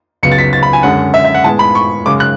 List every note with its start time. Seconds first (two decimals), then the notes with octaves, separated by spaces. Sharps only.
0.23 C#2 C#3 F#3 B3 C#7
0.32 A6
0.38 B6
0.53 A6
0.63 B5
0.73 G#5
0.83 F#2 D3 G#3 C#4 F#5
1.14 E5
1.25 E5
1.34 F#5
1.44 A2 G#3 B3 A5
1.59 B5
1.75 C#6
2.06 F#2 C#3 G#3 C#4 D6
2.20 F#6